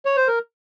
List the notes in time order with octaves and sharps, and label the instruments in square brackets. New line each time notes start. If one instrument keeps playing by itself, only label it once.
[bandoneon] C#5
C5
A#4